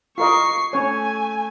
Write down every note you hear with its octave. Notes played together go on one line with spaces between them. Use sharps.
F4 A#4 D#5 C#6 C7
A3 C#4 C#5 G#5